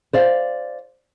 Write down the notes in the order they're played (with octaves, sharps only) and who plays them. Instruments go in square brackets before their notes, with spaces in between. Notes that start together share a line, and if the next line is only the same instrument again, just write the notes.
[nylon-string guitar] C5 D5 F5